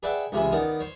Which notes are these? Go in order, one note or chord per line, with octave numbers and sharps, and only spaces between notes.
G#4 B4 D5 E5 F#5 G5
C#2 C3 E3 E4 G#5
D#3 B3 D5
C5 C#5